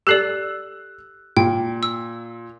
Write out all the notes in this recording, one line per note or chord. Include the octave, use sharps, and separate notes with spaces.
G4 A4 D5 E6 F#6 C7
A#2 G5
E6